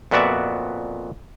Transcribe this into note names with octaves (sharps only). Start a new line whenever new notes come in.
F2 A#2 B3 F#4 D5 E5